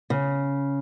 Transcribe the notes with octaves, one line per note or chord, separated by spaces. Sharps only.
C#3